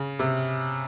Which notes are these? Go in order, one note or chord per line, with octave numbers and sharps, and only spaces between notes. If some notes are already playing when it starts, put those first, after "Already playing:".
Already playing: C#3
C3